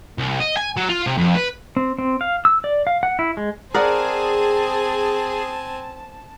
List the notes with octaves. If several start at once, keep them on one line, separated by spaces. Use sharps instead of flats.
C2
D#5
G#5
F#3
F4
C3
F2
B4
C4
C4
F5
E6
D5
F5
F#5
E4
G#3
C4 G#4 A#4 D5 F#5 G#5 A5